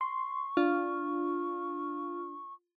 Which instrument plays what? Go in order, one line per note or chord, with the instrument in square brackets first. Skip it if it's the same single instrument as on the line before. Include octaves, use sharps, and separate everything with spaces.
[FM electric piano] C6 [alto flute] C#6
[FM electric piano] D4 [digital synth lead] F4